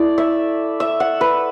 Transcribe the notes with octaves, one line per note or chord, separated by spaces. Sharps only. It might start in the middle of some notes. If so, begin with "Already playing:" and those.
Already playing: A3 E4 D5
E5
E5
F#5
B4